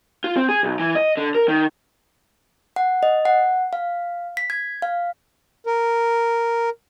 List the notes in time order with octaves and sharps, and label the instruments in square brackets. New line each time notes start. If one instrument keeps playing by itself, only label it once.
[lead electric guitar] F4
C4
G#4
B1
E3
D#5
D3
A#4
D#3
[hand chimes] F#5
D#5
F#5
F5
B6
G#6
F5
[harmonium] A#4